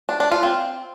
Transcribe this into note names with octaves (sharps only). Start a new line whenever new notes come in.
D4
D4
F4
C4